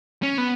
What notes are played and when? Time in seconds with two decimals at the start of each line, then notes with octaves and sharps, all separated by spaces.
0.23 C#4
0.38 B3